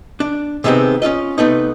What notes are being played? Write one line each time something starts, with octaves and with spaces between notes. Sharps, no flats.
D4
C3 D#3 G#3 B3 C4
C#4 D#4 F4 D#5
C3 A3 B3 D#4